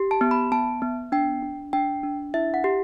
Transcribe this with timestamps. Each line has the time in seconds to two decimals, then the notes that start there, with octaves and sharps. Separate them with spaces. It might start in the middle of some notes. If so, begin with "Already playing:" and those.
Already playing: G4
0.11 A5
0.21 B3
0.31 B5
0.52 B3 A5
0.82 B3
1.12 D4 G5
1.43 D4
1.73 D4 G5
2.03 D4
2.34 E4 E5
2.54 F#5
2.64 G4